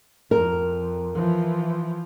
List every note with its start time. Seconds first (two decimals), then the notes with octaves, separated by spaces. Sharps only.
0.31 F2 A#4
1.15 E3 F3